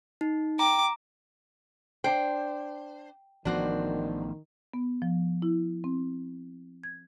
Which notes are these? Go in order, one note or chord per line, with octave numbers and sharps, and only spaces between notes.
D#4
G5 A#5 D6
D4 C5 G5
A1 D#3 F3 B3 D4 F#4 C5
B3
F3
E4
C4
G#6